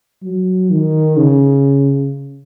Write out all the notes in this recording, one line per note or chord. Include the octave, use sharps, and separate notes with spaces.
F#3
D#3
C#3